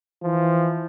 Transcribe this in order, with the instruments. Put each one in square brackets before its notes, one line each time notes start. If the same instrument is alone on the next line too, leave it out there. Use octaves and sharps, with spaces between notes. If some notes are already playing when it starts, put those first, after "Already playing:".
[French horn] E3 [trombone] F3